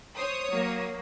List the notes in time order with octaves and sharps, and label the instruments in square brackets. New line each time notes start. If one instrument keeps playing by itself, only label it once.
[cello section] C5 [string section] C#5 D#6
[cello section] F#3 A#3